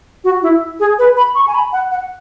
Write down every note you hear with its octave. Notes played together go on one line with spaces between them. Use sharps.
F#4
E4
G#4
B4
B5
C#6
G#5
B5
F#5
F#5